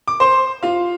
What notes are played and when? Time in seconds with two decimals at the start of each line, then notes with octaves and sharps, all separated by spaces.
0.08 D6
0.20 C5 C6
0.63 F4 F5